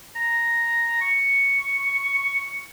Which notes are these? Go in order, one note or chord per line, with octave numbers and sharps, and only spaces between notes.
A#5
C#6